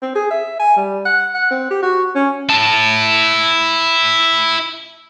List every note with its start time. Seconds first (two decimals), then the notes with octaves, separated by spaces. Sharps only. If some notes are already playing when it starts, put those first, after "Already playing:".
0.02 C4
0.15 G#4
0.31 E5
0.59 G#5
0.77 G3
1.05 F#5
1.34 F#5
1.51 C4
1.71 G4
1.82 F#4
2.15 C#4
2.49 E4 A5